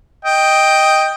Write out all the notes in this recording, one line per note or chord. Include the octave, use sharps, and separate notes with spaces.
D#5 G5